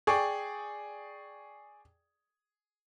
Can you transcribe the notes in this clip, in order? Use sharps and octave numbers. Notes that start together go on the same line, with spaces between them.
G#4 D5 G5 C#6